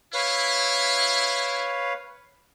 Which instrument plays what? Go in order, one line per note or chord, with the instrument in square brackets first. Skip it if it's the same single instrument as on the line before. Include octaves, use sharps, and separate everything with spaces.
[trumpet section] E4 [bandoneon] B4 C#5 F5